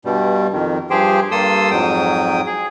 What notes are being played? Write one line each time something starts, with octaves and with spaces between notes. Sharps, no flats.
G2 B2 G3
F2 D#3
G2 F3 G4 G#4 C5 G5
G2 A#3 A4 C6 D#6 E6
F2 G#2 F#3 G5 D#6
G#4